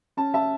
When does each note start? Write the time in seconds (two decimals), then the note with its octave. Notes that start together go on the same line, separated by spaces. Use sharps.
0.17 C#4 A5
0.34 E5 A5